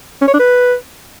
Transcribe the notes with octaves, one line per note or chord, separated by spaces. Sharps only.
C#4
C#5
D4
B4